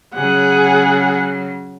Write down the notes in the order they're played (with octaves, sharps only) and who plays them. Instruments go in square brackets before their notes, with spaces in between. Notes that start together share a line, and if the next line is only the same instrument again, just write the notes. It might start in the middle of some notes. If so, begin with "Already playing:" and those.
[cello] C#3 F#3 [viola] G#4 F#5